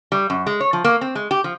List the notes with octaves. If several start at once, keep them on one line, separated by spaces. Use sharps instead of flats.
G3
F#2
G#3
C#5
F3
A#3
C4
G#3
G4
F3